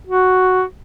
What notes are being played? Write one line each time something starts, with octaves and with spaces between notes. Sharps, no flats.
F#4